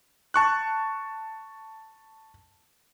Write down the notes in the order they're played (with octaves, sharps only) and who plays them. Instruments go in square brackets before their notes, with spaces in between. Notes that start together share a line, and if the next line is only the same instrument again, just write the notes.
[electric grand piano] A5 C#6 F#6